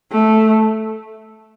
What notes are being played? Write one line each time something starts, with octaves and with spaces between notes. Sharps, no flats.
A3